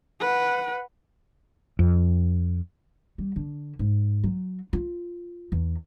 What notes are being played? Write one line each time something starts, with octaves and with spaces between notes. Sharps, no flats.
B4 F#5
F2
G3
D3
G#2
F#3
F4
E2